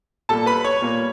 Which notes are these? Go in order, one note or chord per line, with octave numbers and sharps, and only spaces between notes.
A#2 G3 A#3 A4 A5
B4 B5
C#5 C#6
A#2 G3 A#3